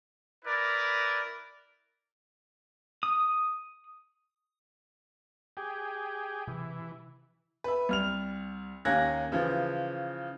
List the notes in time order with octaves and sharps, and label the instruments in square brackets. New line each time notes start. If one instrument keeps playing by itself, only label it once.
[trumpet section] E4 A#4 B4 D5
[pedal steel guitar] D#6
[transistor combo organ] G4 G#4
[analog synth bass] C3 [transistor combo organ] E3
[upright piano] B4 E5
C2 F6 F7
D#2 A#3 C#4 F#6 G#6 A#6
C#3 E3 F3